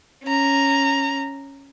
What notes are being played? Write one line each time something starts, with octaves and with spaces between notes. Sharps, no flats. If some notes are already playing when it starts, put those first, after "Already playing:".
C#4 A#5